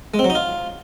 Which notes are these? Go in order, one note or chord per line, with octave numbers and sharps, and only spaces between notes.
G#3
C4
F#3
D#4
F4